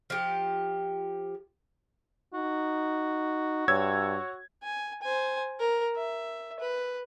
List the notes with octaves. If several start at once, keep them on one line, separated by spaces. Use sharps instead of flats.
F3 G4
D#4 F#4
G2 C#5 E6 G#6
G#5
C5 G#5
A#4
E5
B4